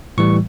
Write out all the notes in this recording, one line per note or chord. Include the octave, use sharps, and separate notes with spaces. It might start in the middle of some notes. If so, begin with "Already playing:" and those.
A2 E3 G3 C#6